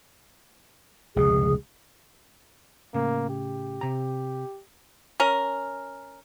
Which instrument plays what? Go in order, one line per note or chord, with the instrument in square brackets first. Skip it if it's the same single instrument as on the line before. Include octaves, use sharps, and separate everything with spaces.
[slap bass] F1 C#2 B2 [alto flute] G#4
[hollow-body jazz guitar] A2 C#3 [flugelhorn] A#3
[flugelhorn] G4
[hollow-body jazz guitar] C3 A#5
[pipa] C#4 A#4